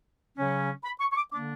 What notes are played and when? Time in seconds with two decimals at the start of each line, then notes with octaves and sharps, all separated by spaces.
0.37 C#3 F#3 C#4
0.84 B5
1.00 C#6
1.12 C#6
1.16 D6
1.32 D3 A#3 D4 D6